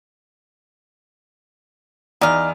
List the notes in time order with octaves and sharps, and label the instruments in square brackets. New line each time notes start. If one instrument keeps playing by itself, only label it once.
[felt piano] E2 D5 [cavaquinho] D#4 F5